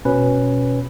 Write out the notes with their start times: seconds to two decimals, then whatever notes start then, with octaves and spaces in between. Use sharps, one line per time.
0.05 B2 C#4 B4